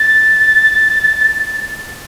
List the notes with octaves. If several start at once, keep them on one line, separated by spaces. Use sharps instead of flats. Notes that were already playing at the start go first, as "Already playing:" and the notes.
Already playing: A6